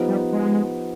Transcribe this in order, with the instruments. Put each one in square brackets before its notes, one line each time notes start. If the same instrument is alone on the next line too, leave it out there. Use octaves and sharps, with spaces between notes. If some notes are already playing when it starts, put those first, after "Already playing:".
Already playing: [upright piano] F3 B3 D#4 G4 C5
[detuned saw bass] G3
G#3